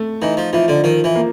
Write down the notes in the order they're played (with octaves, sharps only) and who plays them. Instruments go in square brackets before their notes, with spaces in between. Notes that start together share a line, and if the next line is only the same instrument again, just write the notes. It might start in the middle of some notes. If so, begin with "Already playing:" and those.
Already playing: [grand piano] A3
[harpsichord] E3 [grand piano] D#4
[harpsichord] F3
[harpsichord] E3 [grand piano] F3
[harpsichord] D3
[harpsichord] D#3 [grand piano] F3
[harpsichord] E3
[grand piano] A#3